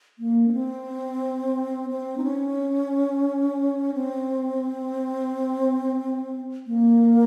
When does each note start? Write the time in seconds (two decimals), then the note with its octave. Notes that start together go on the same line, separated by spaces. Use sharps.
0.19 A#3
0.48 C#4
0.53 C4
1.90 C4
2.18 D#4
2.23 C#4
3.94 C4
6.67 A#3